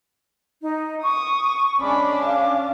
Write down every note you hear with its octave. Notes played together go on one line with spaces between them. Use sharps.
D#4
C#6 D#6
G#3 C#4 D4 B5 D6
F5